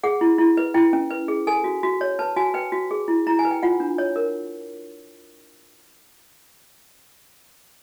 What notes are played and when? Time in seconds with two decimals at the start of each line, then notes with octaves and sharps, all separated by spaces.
0.03 G#4 F#5
0.21 E4
0.38 E4
0.57 B4
0.74 E4 G5
0.93 C#4
1.11 B4
1.28 G#4
1.47 A4 G#5
1.64 F#4
1.83 F#4
2.01 C#5
2.19 B4 A5
2.36 F#4 G#5
2.54 B4 G5
2.72 F#4
2.91 G#4
3.08 E4
3.27 E4 A#5
3.39 G#5
3.45 B4
3.51 G5
3.63 F4 F#5
3.80 D4
3.98 C#5
4.16 A#4